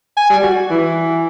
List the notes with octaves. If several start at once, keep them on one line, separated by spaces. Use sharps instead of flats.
G#5
G3
F#4
E3